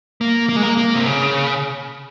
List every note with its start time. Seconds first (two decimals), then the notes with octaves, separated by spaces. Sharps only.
0.21 A#3
0.49 A#3
0.56 G#3
0.63 A#3
0.77 A#3
0.95 C3
1.06 C#3